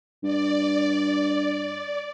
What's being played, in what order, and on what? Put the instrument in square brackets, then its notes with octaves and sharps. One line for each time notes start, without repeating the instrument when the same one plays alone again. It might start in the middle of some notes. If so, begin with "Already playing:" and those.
[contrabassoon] G2 [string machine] D5